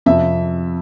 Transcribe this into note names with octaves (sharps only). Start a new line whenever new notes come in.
F2 C3 F3 E5